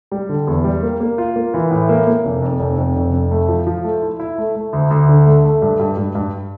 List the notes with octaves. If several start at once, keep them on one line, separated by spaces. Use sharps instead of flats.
G3
D3
E2
G3
A#3
A#3
F4
A#3
E3
A2
A#3
A#3
F1
F2
F1
F2
F1
F2
A3
F3
F3
A3
E4
E4
A3
A3
D2
D2
D3
A3
A3
G2
G2
G2
G2